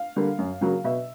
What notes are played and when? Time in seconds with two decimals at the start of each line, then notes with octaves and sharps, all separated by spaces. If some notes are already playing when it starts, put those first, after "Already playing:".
Already playing: F5
0.16 D3 G3 A#3
0.38 F#2
0.61 C#3 F#3 A#3
0.84 B2 E5